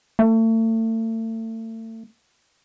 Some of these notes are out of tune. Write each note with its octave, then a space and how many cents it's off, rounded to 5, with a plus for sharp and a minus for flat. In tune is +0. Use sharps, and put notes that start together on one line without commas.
A3 +35